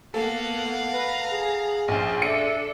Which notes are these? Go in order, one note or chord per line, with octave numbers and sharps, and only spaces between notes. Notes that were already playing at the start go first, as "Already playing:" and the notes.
A#3 B3 A4 F5 F#5
B4 A#5
G#4
A#1 C#4 C5
D4 A4 D5 E5 C#7